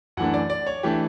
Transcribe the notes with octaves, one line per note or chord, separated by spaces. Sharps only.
F#2 E3 A3 D4 F#5
D5
D5
C#5
E3 A3 D4 G4